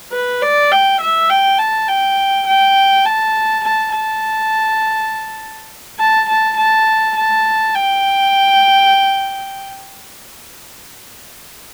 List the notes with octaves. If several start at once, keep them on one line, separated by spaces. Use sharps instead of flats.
B4
D5
G5
E5
G5
A5
G5
G5
A5
A5
A5
A5
A5
A5
A5
G5